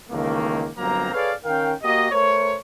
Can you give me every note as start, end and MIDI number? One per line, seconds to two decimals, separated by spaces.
0.10 0.68 37
0.10 0.68 51
0.10 0.68 52
0.10 0.68 57
0.10 0.68 58
0.78 1.09 31
0.78 1.09 43
0.78 1.09 54
0.78 1.09 58
0.78 1.09 60
0.78 1.09 82
1.13 1.32 68
1.13 1.32 69
1.13 1.32 71
1.13 1.32 73
1.13 1.32 74
1.13 1.32 77
1.44 1.73 51
1.44 1.73 61
1.44 1.73 70
1.44 1.73 77
1.44 1.73 79
1.83 2.09 58
1.83 2.09 66
1.83 2.09 67
1.83 2.09 75
2.11 2.56 57
2.11 2.56 70
2.11 2.56 72
2.11 2.56 73